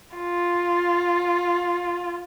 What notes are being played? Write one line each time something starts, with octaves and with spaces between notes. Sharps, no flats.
F4